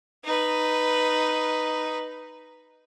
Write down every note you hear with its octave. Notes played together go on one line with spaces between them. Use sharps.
D#4 B4